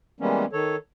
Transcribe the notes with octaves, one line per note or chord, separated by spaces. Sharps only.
E3 G3 G#3 A#3 B3 C#4
D#3 A4 C#5